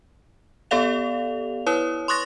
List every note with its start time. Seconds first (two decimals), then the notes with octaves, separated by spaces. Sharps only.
0.71 B3 G4 A4 D5 F5 F7
1.67 E4 B4 C#5 D#6
2.08 C6 C#6 D#6 F#6 A6 A#6